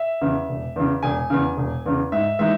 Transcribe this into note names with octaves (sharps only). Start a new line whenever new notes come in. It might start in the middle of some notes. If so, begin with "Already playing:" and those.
Already playing: E5
E2 C#3
E1
E2 C#3
E1 G#5
E2 C#3
E1
E2 C#3
G#2 E5
E3 G#3 D#4 E5